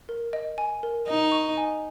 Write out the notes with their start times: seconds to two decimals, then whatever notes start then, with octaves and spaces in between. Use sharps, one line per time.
0.09 A#4
0.33 D#5
0.58 G#5
0.83 A#4
1.08 D#4 D#5
1.32 C#6
1.57 G#5